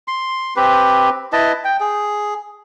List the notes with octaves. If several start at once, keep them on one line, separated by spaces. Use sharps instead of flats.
C6
C4 G4 B4
E4 B4 D#5 A5
G5
G#4